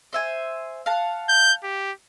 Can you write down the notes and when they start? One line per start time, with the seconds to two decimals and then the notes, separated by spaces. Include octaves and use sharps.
0.13 C5 E5 G#5
0.86 F5 F#5 A5
1.29 G6
1.63 G4